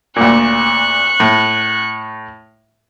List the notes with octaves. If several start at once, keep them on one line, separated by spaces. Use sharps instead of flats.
D2 A#2 C#6 F#6
A2